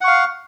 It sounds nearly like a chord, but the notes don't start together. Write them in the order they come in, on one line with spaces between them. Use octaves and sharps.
F#5 C#6 F5